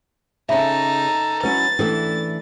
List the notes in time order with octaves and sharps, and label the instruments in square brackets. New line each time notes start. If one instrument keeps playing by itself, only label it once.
[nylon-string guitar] C#3 C#4 [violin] D#4 A4 [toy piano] E5 B5
[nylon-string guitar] F#3 C#4 E4 [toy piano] B4 [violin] A6
[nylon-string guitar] E3 A3 D4 [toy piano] C#4 A4